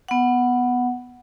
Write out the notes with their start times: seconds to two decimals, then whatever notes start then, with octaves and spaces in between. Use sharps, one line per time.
0.09 B3 F#5